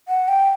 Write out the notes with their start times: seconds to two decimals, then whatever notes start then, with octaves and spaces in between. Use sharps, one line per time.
0.08 F#5
0.28 G5